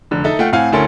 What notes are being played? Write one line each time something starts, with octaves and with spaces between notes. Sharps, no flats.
F1 D3
D#4 A4 E5
A3 F4 F#5 G5
A2 C4 F5 F#5 G#5
D2 C#4 E4 A4 A#4 C6